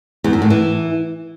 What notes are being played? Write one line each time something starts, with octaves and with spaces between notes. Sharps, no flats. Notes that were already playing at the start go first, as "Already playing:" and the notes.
E2
F#2
A2
E3